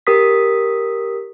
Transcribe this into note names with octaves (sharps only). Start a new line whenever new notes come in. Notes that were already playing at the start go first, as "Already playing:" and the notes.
G4 A#4 D#6 B6